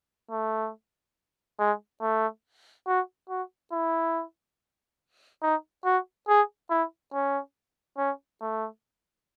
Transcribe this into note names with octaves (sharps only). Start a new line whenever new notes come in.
A3
G#3
A3
F#4
F#4
E4
D#4
F#4
G#4
E4
C#4
C#4
A3